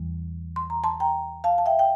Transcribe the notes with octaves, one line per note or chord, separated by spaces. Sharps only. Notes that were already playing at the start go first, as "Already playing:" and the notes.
Already playing: E2 E3 G3
C6
A#5
A5 C6
G5 A#5
F5 A5
A5
E5 G5
G5